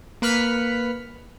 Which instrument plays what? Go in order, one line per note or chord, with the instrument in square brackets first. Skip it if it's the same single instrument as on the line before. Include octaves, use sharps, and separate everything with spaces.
[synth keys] A#3 B4 B5 F6 B6 C#7